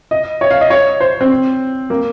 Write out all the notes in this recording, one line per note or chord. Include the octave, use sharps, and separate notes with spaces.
D#5
C#5
F5
D#5
C#5
C5
C4
A#3